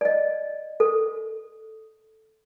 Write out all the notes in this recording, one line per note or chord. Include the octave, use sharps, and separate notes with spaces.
D5 D#5
A4